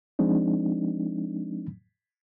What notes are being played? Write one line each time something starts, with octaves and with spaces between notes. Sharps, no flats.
F3 G#3 C4 D4 D#4